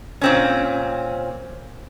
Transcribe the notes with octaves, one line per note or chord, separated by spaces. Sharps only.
A#2 C4 C#4